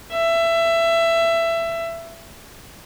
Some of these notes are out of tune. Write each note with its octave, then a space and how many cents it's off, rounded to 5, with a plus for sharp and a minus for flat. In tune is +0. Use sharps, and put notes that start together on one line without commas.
E5 +20